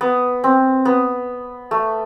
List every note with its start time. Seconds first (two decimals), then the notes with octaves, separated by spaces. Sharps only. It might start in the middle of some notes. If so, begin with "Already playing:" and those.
0.01 B3
0.44 C4
0.85 B3
1.71 A3